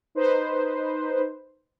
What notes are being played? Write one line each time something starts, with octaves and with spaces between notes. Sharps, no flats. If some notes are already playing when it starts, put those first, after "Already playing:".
D#4 B4 C5